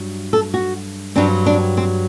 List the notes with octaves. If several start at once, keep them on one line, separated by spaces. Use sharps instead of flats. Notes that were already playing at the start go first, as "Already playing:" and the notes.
Already playing: G2 F#3
A4
F#4
G2 F#3 C4 D4
D4
C4